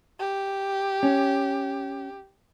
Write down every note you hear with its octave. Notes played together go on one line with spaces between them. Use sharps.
G4
C#4